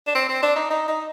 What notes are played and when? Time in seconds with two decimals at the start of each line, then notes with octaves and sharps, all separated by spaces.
0.07 D4
0.15 C4
0.29 C4
0.43 D4
0.56 D#4
0.70 D#4
0.88 D#4